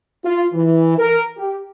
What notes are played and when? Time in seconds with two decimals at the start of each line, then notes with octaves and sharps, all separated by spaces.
0.24 F4
0.53 E3
0.98 A#4
1.37 G4